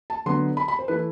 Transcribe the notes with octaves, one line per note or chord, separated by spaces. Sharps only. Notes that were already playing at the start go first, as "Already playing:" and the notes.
A5
D3 F#3 B3 C6
B5
B5
C5
E3 A3 E4 B4